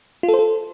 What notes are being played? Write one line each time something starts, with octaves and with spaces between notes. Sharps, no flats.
F4
A4
C5
A4